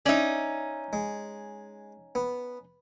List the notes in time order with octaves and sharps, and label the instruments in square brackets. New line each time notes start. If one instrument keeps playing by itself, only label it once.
[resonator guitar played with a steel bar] C#4 D#4 [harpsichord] D5 E5
[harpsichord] G#3
B3